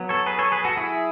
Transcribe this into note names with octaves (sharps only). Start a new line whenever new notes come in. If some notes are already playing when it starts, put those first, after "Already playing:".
Already playing: F#3 B3
A4 C#5
G#4 B4
A4 C#5
G#4 B4
F#4 A4
E4 G#4